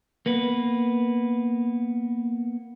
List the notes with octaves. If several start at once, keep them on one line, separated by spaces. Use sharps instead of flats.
A#3 B3 B4